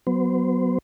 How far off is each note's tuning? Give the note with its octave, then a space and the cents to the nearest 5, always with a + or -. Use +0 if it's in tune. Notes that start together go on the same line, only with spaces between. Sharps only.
F#3 +0 B3 +0 C5 -25